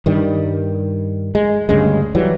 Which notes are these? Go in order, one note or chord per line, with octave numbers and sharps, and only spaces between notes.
G2 D#3 G3
G#3
D2 G2 C#3 G#3
E3 F#3 G3